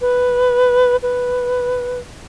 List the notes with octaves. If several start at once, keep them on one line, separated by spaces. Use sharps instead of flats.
B4
B4